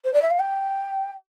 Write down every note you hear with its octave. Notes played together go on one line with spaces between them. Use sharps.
C5
D5
E5
F5
G5